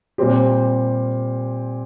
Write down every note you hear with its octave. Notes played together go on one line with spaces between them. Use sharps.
A#2 G3 C4 G4